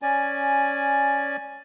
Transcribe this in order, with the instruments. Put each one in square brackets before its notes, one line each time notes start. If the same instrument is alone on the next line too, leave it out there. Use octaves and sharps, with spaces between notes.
[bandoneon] C#4 D5 G#5